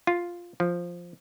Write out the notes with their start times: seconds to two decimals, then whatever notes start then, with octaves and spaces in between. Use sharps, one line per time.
0.07 F4
0.60 F3